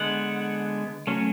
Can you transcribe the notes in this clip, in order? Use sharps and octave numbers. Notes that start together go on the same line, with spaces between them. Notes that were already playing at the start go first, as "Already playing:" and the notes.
Already playing: D3 G#3 B3 F#5
F#3 A3 C#4